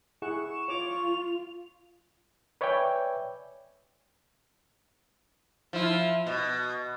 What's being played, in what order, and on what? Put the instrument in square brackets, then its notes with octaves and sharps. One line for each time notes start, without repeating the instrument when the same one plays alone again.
[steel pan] E4 G#4 F#5 [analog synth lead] C#6 [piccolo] E7
[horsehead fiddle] F4 [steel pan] C#5 D6 [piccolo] F7
[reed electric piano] B4 C#5 D5 E5 G5 G#5
[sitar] F3 E4
B2